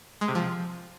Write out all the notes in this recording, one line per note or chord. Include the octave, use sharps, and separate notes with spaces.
G#3
C3
F3